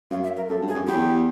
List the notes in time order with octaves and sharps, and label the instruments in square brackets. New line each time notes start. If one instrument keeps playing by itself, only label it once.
[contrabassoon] F#2 [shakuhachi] F5
[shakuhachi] E5
A#4
[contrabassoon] F#2 [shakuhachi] A4
[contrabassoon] G2
[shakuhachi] G#4
[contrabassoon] F#2
[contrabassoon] E2 [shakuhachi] G4